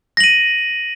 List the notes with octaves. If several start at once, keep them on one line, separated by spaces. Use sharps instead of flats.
A#6 D#7 F#7